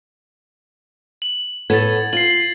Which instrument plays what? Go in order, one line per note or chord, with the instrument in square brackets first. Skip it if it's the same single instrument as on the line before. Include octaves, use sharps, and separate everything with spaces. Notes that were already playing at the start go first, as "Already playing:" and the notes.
[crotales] F#7
[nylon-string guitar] A2 B3 A4 [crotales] G#6 A6
[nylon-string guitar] F4 [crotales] C7 F#7